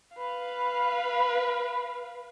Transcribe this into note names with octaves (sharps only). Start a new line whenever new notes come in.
B4 F5